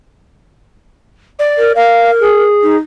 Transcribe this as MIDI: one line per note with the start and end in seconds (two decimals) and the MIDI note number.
1.39 1.72 74
1.58 1.73 70
1.75 2.44 70
1.75 2.10 77
2.20 2.76 68
2.63 2.76 63